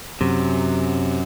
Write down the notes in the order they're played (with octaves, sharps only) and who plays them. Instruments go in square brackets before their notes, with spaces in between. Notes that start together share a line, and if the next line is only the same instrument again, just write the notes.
[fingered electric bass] F#2 [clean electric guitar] C3